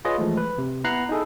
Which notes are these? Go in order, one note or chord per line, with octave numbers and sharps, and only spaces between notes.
F4 G#4 B4 C#5 D#5
E3 F3 G#3 A3
B4
C3
B3 E4 F#5 A#5 F#6 C7
D#4 E4 G#4 A4